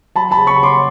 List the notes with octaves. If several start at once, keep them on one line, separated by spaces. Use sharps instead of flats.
F#3 A5 B5
A5 B5
C#3
B5 C#6
C#3
C6 D6